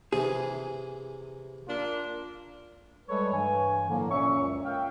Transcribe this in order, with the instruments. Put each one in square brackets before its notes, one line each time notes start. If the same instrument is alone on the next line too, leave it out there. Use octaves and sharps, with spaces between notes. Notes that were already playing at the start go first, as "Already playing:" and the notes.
[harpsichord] C3 E3 [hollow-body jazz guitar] G#4
[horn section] A#3 D4 F4
[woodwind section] G3 G#3 A4 B4 C#5
G2 E3 G#5
A2 D3 F3 F#3 A#3
A#2 C#4 C#5 E5 C#6
C#2 F#2
E5 F5 G5